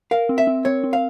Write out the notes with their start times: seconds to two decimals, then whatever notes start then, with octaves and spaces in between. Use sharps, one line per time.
0.11 A#4 F5
0.29 C4
0.38 E5
0.47 C4
0.65 C4 C#5
0.84 C4
0.93 F5